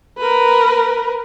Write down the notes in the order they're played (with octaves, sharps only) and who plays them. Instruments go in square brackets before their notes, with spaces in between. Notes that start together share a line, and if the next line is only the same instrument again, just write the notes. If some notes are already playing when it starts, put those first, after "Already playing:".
[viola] A#4 B4